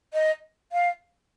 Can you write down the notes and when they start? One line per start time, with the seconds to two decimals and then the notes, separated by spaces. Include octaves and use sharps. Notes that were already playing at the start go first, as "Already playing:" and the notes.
0.13 D#5
0.72 F5